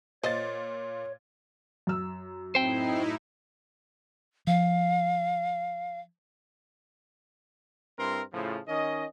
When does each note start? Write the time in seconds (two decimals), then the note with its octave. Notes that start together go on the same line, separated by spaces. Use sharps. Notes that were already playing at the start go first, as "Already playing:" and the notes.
0.23 A#2 F4 C5 C#5 D#5 A6
1.87 F#2 E6
2.55 A2 C4 D#4 E4 C5 G5
4.47 F3 F5
7.99 G2 C4 E4 A#4 C6
8.34 A2 C#3 F3
8.68 D#3 C#4 D#5